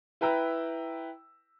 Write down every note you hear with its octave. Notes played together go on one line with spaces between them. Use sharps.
E4 B4 G5 A#5 E6